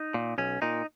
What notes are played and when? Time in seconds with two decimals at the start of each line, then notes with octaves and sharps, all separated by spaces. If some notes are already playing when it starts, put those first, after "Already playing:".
Already playing: D#4
0.14 A#2
0.38 B1 C#4
0.62 A#2 D#4